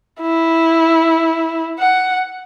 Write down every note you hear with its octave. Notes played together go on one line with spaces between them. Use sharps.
E4
F#5